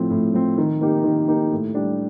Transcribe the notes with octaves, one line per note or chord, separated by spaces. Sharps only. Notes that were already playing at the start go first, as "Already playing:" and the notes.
Already playing: A2 F3 C4
A2
F3 C4
D#3
A#3 D#4 G4
D#3
A#3 D#4 G4
A2
G3 D4 G4